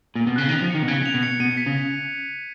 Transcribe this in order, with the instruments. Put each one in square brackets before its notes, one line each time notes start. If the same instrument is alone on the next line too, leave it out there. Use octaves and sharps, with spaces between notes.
[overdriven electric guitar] A#2
B2
[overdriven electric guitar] C#3 [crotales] F#6
[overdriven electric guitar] D#3
[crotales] F7
[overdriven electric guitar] F3
[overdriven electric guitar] D#3 [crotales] C#7
[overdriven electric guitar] B2
[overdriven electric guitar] C#3 [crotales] G#6
[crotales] F7
[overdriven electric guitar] B2
[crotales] C#7
[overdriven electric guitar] B2 [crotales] D#7
[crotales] B6
[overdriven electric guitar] C#3